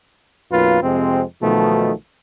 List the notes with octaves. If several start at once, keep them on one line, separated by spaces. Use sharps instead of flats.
B1 F#2 A#3 F4 B4
F2 C3 G#3 C4
B1 B2 D#3 F3 A3